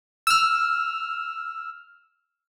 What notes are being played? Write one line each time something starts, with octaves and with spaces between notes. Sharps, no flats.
E6 F6